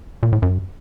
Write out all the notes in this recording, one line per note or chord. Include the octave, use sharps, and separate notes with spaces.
A#2
A2
F#2